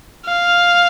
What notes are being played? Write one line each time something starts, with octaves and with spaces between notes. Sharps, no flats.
F5